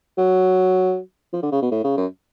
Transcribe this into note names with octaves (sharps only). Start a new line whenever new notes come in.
F#3
F3
D3
C#3
B2
A2
C#3
F#2